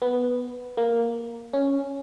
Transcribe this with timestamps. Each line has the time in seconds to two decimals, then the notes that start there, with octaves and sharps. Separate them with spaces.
0.02 B3
0.77 A#3
1.53 C#4